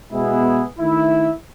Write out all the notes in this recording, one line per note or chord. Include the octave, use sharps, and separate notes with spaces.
B2 G#3 B3 E4 G#4
D#3 A3 E4